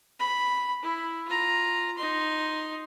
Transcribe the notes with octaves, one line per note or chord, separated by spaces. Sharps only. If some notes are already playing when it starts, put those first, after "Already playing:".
B5
E4
F4 A#5
D#4 C6